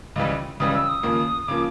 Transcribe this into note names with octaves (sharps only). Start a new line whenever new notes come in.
C#2 C#3 E3 G3
C#2 C#3 E3 G3 D#6
E6
D#6
D#2 C#3 F3 A#3
C#3 F3 A#3 D6